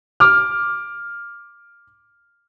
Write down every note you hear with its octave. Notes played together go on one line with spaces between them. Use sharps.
D6 F6